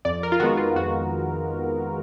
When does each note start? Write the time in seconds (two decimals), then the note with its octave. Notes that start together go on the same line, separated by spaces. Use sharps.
0.05 F2 D5
0.23 A#4
0.32 F4
0.40 D#3 G#3 B3 F#4
0.57 F4
0.75 F2 F#4